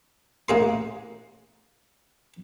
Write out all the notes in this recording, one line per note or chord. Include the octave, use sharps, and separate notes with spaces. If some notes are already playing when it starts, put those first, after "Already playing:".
A1 A#3 G#4 C6